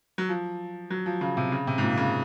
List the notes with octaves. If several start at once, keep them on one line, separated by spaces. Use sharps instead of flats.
F#3
F3
F#3
F3
C#3
C3
C#3
C3
G#2
A#2
C#3